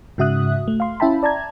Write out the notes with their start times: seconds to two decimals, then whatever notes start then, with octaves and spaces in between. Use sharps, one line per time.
0.18 G#2 C#3 F#4 E5 D#6 F#6
0.68 A3
0.80 F5 C6
1.00 C#4 E4 E5 G5 A5 B5
1.23 D5 A5 A#5 G#6